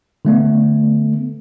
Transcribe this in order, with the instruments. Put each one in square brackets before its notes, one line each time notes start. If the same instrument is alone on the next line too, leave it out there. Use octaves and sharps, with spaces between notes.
[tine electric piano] D3 A3 B3